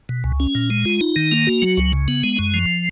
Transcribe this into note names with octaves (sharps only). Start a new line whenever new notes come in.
B2
C#2
C#4
A#2
G#3
F4
D#4
D#3
A#3
F#4
F#3
C#2
C#3
B3
G#3
F#2
F3